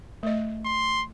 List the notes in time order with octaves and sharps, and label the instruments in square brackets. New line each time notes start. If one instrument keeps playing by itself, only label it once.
[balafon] A3 D#5
[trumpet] C6